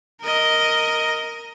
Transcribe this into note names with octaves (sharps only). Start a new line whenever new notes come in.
A#4 D#5